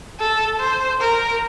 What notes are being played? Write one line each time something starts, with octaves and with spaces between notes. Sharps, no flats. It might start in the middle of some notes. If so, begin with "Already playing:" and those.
A4
C5
A#4